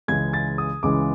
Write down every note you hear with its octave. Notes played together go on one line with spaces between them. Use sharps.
C#2 C#3 E3 G#3 G#6
A6
D#6
C#2 C#3 E3 G#3 D6